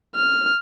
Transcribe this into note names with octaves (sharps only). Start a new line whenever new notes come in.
F6